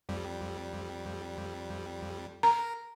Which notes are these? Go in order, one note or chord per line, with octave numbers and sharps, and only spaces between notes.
F2 G3
A#4 A#5